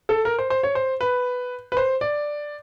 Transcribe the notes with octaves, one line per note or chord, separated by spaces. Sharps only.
A4
A#4
C5
C5
C#5
C5
B4
B4
C5
D5